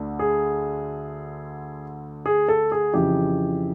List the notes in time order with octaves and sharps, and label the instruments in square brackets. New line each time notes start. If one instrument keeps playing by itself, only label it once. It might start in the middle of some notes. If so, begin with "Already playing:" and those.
Already playing: [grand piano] D2 D3
G#4
G#4
A4
G#4
F2 C#3 E3 G4